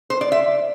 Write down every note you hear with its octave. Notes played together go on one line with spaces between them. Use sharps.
C5
D5
E5